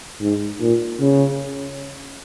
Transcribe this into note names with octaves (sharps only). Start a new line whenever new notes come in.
G#2
A#2
C#3